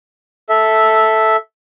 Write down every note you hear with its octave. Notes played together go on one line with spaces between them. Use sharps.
A4 E5